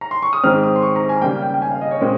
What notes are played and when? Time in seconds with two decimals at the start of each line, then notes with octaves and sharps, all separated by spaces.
0.01 A#5
0.11 C6
0.22 C#6
0.33 D#6
0.43 G#2 D#3 G#3 C4 F6
0.63 D#6
0.76 C6
0.82 C#6
0.96 A#5
1.09 G#5
1.22 C#3 G3 A#3 G5
1.42 G5
1.54 G5
1.62 G#5
1.71 F5
1.81 D#5
1.91 C#5
2.01 A#2 G#3 C4